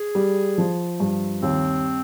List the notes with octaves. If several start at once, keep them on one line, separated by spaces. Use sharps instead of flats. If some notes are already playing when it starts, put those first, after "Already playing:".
Already playing: G#4
G3
F3
G2
D#2 C4